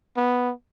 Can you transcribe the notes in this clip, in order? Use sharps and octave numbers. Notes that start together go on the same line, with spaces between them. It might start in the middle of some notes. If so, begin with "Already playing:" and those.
B3